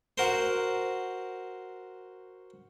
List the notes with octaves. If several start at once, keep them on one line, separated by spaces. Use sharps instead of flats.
F#4 A#4 C5